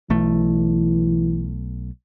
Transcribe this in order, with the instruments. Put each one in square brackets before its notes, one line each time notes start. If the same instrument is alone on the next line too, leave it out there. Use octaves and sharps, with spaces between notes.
[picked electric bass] B1 A3 [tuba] E3